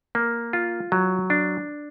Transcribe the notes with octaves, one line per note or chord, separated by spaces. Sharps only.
A#3
F4
F#3
D4